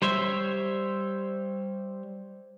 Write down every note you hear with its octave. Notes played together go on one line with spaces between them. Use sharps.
G3 C5 C#5 E5